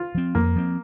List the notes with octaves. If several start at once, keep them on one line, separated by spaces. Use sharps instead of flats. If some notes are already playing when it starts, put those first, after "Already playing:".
Already playing: F4
F3 C4
F2 A#3
F3 C4